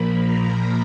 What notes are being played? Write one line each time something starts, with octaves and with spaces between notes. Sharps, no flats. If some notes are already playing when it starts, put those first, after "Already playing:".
Already playing: A#2 F3 A#3 B5
A#5